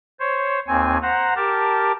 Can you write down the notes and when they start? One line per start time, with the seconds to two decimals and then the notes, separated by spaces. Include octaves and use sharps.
0.20 C5 C#5
0.68 D#2 C4 G#5
1.02 C5 F#5 A#5
1.36 G4 A#4 A5